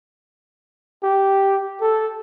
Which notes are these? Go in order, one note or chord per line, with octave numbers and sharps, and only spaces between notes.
G4
A4